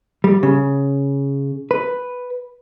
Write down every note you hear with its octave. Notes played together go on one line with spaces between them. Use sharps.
G3
C#3
B4